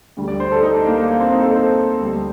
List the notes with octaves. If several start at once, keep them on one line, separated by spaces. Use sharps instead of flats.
D2 D3 G3
D5
C5
A4
D#4
D4
A#3
A#3
A#3
C4
D#4
A4
C5
D2 D3 G3